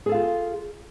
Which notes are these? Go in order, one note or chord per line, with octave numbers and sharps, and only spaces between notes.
F4 G#4 A4 F5